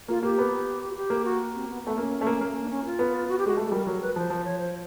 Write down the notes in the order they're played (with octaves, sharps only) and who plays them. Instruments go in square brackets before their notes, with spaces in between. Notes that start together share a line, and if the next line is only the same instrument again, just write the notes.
[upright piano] A#3 [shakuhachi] F4
[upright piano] A#3 [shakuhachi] G4
[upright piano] B3
[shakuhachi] F#4
G4
[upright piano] A#3
[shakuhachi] F#4
C4
B3
[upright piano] A3 [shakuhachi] B3
[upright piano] A#3 [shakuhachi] C#4
[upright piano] A3
A#3
A#3
[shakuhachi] D4
C#4
F4
[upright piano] B3
[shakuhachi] F#4
G4
[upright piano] G#3 [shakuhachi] F#4
[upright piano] A3
G#3
[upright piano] G3 [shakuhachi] A#4
[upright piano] F#3 [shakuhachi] A#4
[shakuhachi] B4
[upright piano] F3 [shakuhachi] C5
[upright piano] F3
[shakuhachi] C#5
C5